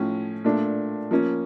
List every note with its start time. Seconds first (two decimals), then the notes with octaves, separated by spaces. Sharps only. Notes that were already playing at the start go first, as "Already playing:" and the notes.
Already playing: A2 F3 C#4
0.44 A#2 A3 D4
1.11 F3 A#3 C#4